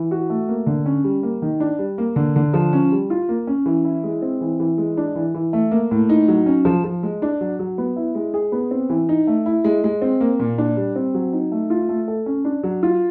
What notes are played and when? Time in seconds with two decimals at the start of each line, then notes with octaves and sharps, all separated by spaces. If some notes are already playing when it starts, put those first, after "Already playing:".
Already playing: E3
0.11 F#4
0.30 A3
0.49 A#3
0.67 D3
0.86 C#4
1.04 G3
1.23 A#3
1.42 D#3
1.60 D4
1.79 G3
1.98 A#3
2.16 D3
2.36 D3
2.54 F3
2.73 C#4
2.92 G3
3.10 F4
3.29 A#3
3.47 C#4
3.66 E3
3.84 E4
4.04 G#3
4.22 C4
4.41 E3
4.60 E3
4.78 G#3
4.97 D4
5.15 E3
5.34 E3
5.53 A3
5.71 A#3
5.91 A2
6.09 D#4
6.28 F#3
6.46 C#4
6.65 F3
6.84 F3
7.03 G#3
7.22 D4
7.41 F#3
7.59 F#3
7.78 B3
7.96 E4
8.15 G#3
8.34 G#4
8.52 B3
8.71 C4
8.90 E3
9.09 D#4
9.27 A3
9.46 E4
9.64 G#3
9.84 G#3
10.02 C4
10.21 A#3
10.39 A#2
10.58 D4
10.77 G3
10.96 C4
11.14 F#3
11.33 D#4
11.52 A3
11.70 F4
11.89 A3
12.08 A4
12.26 C#4
12.45 D4
12.63 F#3
12.83 F4